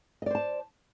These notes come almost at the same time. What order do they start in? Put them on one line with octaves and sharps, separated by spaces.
D#5 D5 C5 A5